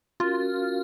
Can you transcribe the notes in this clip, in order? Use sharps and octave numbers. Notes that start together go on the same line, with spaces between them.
C#4 F4 F#4 A#4